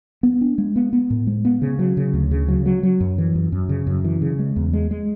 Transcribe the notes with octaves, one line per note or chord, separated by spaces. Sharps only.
B3
D4
G#3
B3
B3
A2
G#3
B3
C#3
F#3
C#3
D2
C#3
F#3
F#3
F#3
F#2
E3
F#2
F#2
C#3
F#2
E3
C#3
G#3
E2
G#3
G#3